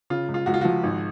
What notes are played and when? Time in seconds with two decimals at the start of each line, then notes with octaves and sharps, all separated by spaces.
0.10 C#3 F4
0.28 C#2
0.34 F4
0.46 C#2 F#4
0.54 F4
0.61 F3 F#4
0.83 G#1